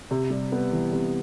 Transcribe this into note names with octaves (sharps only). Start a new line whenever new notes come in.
C3
G3
B3
E3
C3